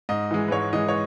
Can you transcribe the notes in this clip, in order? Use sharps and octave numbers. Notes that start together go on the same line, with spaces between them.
G#2 D#5
E3 G#3
B4
G#2 C#5
E3 G#3 D#5
C#5